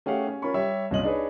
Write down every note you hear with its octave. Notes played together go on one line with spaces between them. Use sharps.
A3 C#4 G4 G#4 F5 F#5
C#4
C#4 F4 A#4 B5 C#6
G3 G4 C#5 E5
C2 A#2 C#4 D#5 F#7
D4 D#4 G#4 B4 C#5